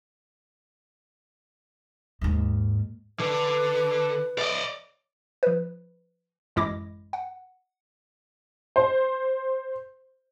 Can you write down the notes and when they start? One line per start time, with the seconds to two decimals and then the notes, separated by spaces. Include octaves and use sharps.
2.21 D#2 G#2
3.19 D3 B4
4.38 D5 D#5
5.43 F3 B4
6.56 A1 F#2 G#3 E4 D6 A#6
7.13 F#5
8.76 C5